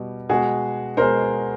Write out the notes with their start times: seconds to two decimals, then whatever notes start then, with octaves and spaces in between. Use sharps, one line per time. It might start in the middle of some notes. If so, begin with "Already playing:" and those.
Already playing: B2 G3
0.29 B2 G#3 F#4 G#4
0.97 B2 G#3 A#4 C5